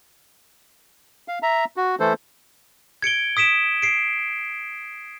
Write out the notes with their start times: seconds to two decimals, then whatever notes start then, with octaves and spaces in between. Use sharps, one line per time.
1.28 F5
1.43 E5 A#5
1.77 F#4
2.00 E3 A3 A4 C5
3.02 G#6 C#7 D7 G7
3.37 D#6 B6 D7 E7
3.82 C7 D7